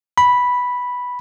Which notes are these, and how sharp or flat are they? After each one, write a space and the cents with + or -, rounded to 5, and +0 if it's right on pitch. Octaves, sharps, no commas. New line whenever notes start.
B5 -5